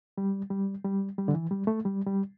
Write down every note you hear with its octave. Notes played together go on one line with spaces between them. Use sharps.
G3
G3
G3
G3
D3
E3
G3
A3
G3
G3